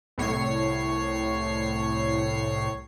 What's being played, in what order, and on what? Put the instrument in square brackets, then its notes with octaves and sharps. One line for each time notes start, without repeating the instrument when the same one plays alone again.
[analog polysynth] C2 A2 C#5 C7